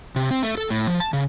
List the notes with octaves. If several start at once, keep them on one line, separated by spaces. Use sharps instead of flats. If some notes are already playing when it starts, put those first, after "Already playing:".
C3
C4
A3
A4
A2
F3
A5
C#3